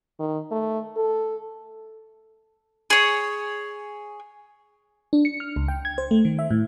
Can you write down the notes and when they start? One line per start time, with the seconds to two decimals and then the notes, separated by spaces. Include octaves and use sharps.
0.20 D#3
0.51 A3
0.97 A4
2.90 G#4 C#5
5.13 D4
5.25 C#7
5.40 F6
5.56 C#2
5.68 G5
5.85 G#6
5.98 C5
6.11 A3
6.25 D#3
6.39 E5
6.51 A2